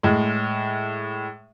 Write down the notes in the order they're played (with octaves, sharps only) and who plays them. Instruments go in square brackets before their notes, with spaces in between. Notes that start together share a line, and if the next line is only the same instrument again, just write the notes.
[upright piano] A2 G#3